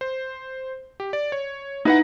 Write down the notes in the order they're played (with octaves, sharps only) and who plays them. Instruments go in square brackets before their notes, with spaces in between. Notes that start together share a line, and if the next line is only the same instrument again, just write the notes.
[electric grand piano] C5
G4
D5
C#5
[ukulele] D#4 [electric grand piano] E4 B4 F#5